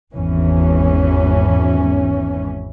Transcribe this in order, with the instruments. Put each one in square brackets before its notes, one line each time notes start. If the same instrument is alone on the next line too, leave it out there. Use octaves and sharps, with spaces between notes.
[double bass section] G#1 E2 E3 C#4